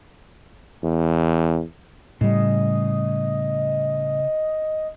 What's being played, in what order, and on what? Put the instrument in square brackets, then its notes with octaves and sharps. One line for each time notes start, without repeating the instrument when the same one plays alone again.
[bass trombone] E2
[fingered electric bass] A2 G3 [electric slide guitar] C#3 [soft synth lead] D#5